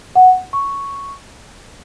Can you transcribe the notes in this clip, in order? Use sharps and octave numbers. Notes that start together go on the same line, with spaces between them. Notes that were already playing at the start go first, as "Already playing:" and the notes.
F#5
C#6